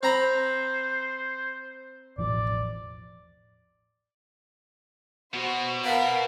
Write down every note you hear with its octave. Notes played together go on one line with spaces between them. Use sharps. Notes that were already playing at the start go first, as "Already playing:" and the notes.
C4 C5 A#5 B5
E1 A1 F3 D5
B2 F#4 C5
B3 A#4 F5 A5 B6